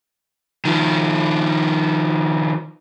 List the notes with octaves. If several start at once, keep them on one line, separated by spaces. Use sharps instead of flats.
D#3 F3